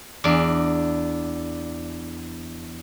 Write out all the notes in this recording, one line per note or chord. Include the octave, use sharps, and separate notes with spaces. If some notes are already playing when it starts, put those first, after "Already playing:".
E2 D4